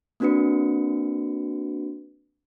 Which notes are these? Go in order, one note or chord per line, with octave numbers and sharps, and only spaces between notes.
A#3 C4 D4 F#4 B4 C#7